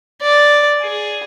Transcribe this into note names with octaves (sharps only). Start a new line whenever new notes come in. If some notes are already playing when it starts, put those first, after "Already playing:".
D5
G#4